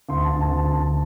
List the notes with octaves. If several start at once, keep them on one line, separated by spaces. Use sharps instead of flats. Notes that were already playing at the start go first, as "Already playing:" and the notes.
D2 C6
A5
D2
A5
D2
A5
D2 A5